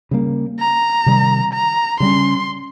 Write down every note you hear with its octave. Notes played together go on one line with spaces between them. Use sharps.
C#3 G3 A#3
A#5
C3 D#3 G3
A#5
C#3 G3 C#4 C6